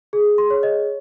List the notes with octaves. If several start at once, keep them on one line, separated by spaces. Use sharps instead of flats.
G#4
C6
C#5
D#5